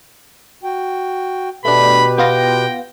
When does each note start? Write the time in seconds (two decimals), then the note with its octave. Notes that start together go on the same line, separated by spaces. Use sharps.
0.63 F#4 G5
1.65 B2 A3 D4 G4 B4 B5
2.18 B3 F4 G5 A#6